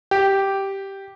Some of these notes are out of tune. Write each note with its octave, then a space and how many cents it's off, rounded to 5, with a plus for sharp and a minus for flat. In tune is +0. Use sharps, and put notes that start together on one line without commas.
G4 -5